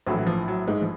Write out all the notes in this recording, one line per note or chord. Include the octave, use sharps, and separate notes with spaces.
A#1 A2 E3 F#3
F#3
F3
F#3
G#2 G#3
F3